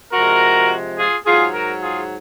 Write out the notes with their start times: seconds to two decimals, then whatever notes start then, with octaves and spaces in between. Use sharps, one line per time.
0.12 C3 F3 G#3 F#4 A#4
0.97 F4 G#4
1.25 G#2 F#3 F4 G#4
1.53 F#4 A#4
1.82 F4 G#4